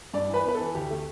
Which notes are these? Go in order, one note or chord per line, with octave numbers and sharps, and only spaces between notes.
G2 D5
E3 B4
B3 B4
E3 A4
D2 G4
A3